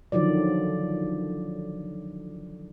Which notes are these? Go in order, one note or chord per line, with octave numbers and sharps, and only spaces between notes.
D3 D#3 F3 F#3 D5